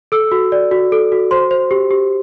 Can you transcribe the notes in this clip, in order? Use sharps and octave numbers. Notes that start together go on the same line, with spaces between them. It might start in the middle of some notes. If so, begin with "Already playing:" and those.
A4 E6
F#4
D5
F#4
A4
F#4
C5 C6
C5
G4
G4